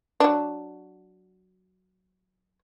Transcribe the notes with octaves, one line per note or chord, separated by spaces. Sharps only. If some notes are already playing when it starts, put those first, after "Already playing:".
F#3 D4